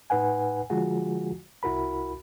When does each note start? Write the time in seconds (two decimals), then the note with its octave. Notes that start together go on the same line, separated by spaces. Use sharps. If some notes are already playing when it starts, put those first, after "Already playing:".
0.10 A2 D#4 B4 F#5 G#5
0.70 D3 F3 G#3 F4 F#4 G#4
1.63 C2 E4 F#4 A#4 B5